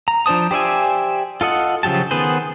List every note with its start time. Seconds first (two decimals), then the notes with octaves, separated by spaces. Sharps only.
0.08 A#5
0.26 F3 D4 C5 A5 D#6
0.51 G4 C5 D5 E5 G#5
1.41 F4 A4 D#5 F#5
1.83 C#3 F3 F#3 G4 A5
2.11 D#3 B3 G#4 B4 C5